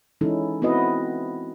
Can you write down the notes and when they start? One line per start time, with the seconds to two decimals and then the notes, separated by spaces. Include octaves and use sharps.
0.21 E3 G#3 C#4 D#4 E4 A4
0.62 B3 C4 E4 F#4 B4 D#5